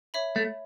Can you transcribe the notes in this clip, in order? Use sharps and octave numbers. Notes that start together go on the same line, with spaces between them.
C#5 E5 B5
A3